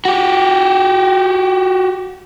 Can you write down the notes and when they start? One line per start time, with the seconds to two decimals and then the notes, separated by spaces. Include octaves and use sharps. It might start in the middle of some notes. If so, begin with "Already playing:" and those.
0.05 F#4 G4